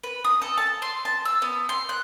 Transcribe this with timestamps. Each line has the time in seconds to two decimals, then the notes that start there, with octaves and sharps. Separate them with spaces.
0.03 B4
0.24 D#6
0.42 A4
0.57 A5
0.82 C6
1.05 A5
1.25 E6
1.42 B3
1.69 C6
1.89 F#6